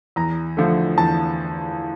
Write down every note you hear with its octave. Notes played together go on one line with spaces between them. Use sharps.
E2 A#5
D3 F3 A3
E2 A5